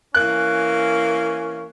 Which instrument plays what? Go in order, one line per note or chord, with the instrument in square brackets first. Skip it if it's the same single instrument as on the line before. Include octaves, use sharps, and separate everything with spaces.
[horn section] E3 A#3 C#4 [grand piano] F#6